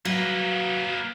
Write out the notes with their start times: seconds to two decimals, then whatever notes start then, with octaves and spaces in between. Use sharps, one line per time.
0.05 F#3 A#3 B4